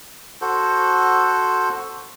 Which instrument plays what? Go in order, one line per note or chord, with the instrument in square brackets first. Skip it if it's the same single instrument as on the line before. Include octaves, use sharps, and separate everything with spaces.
[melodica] F#4 A4 C5